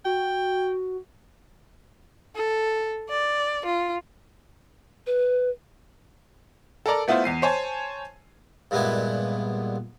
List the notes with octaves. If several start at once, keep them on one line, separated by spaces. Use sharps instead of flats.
F#4 G5
A4
D5
F4
B4
A4 A#4 D5 A#5
A3 B3 E4 F4 C5
E2 C7 D#7
C5 C#5 G#5 A5
G2 A#2 G#3 B3 E4